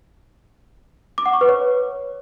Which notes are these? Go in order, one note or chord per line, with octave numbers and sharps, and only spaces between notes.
D6
F#5
C#6
B4
C#5